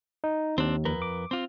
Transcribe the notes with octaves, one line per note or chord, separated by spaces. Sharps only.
D#4
D#2 C4 D4
F2 A#4 B4
D6
C4 F4